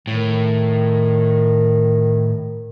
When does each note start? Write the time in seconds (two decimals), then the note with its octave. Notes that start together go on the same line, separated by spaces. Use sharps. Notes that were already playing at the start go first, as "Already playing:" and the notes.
0.07 A2 D#3